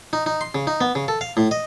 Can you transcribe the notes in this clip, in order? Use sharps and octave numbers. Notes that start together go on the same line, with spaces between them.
D#4
D#4
C6
C#3
D#4
B3
C#3
A4
F5
A2
D#5